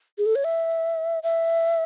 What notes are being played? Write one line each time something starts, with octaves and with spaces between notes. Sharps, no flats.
G#4
A4
C#5
E5
E5